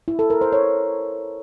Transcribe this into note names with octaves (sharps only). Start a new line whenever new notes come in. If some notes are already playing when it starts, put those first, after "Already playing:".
E4
A4
A#4
C5
C#5